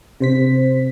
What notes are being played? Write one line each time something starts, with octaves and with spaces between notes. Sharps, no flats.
C3 C5 B6